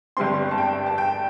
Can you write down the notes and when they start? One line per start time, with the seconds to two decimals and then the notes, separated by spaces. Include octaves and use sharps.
0.17 G1 G2 G3 C4 C6
0.51 A5
0.58 G5
0.87 A5
0.98 G5